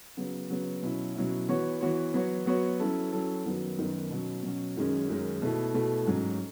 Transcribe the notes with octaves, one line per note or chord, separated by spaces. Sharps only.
C#3 F#3 B3
C#3 F#3 B3
B2 F#3 C#4 E4
B2 F#3 C#4 E4
E3 B3 F#4 C#5
E3 B3 F#4 C#5
F#3 B3 F#4 C#5
F#3 B3 F#4 C#5
F#3 C#4 E4 A4
F#3 C#4 E4 A4
F#2 D#3 F#3 B3
F#2 D#3 F#3 B3
B2 F#3 C#4
B2 F#3 C#4
F#2 D#3 G#3 C#4
F#2 D#3 G#3 C#4
B2 A3 E4
B2 A3 E4
G#2 F#3 C#4